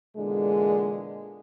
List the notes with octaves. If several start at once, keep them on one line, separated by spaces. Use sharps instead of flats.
E2 A#2 D3 G#3